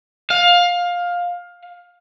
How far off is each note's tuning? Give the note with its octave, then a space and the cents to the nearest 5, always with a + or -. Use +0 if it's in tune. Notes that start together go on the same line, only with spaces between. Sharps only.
F5 +15